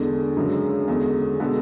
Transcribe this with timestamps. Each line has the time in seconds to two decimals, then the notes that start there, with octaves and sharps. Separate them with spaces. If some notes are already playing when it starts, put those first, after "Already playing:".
Already playing: E2 D3 G#3 D4
0.36 F#2 C#3 G#3 D4
0.88 E2 D3 G#3
1.40 B2 G#3 B3 D4 A4